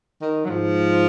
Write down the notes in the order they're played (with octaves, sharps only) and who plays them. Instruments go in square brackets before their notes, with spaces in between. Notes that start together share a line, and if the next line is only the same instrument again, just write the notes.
[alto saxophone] D#3
F#3
[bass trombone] G#2 [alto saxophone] F3